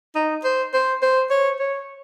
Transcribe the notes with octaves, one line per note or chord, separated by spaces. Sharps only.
D#4
C5
C5
C5
C#5
C#5